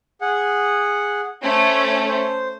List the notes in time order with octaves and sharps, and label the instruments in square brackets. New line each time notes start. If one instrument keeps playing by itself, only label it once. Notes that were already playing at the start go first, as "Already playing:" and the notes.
[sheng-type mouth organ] G#4 F#5
[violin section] A3 C#4 [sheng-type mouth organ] C5
[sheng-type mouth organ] C5